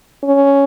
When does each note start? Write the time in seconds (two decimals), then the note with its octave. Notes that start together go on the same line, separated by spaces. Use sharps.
0.23 C#4